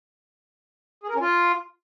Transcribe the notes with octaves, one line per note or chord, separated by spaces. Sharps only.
G#4
A#4
C#4
F4